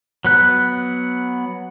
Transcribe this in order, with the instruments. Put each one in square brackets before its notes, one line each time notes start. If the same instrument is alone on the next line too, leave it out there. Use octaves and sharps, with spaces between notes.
[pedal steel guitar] F#3 B3 F#6